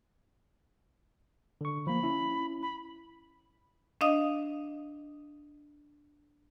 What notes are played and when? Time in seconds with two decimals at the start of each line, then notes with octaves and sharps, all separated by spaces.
1.61 D3 C#6
1.87 F3 A#3 B5
2.03 C#4 E4
2.62 B5
4.01 D4 D#5 F5 D#6